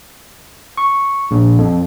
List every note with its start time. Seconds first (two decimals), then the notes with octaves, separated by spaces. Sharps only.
0.78 C#6
1.31 A#1
1.58 F2